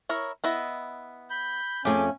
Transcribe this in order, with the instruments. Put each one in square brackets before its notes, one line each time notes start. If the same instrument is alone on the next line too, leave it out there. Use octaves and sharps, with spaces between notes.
[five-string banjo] E4 A#4 C#5
B3 E4 D#5
[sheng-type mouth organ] B5 G6
[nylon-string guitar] F2 A3 [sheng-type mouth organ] C#4 [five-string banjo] G4 G#4 G#5